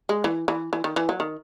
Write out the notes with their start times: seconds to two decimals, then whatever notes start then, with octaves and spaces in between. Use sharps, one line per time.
0.09 G#3
0.24 E3
0.48 E3
0.73 E3
0.84 D#3
0.96 E3
1.09 F#3
1.20 D#3